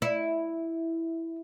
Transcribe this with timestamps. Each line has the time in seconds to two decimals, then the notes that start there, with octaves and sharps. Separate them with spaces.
0.02 E4